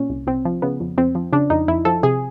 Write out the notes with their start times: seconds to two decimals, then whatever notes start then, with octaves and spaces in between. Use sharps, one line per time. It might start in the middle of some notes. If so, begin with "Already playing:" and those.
Already playing: A#2 C#4
0.09 C2
0.27 C2 C4
0.45 F3
0.62 C#3 B3
0.80 F2
0.98 F2 C4
1.15 F3
1.33 C#3 D4
1.50 F2 D#4
1.68 F2 E4
1.85 F3 A4
2.03 C3 G#4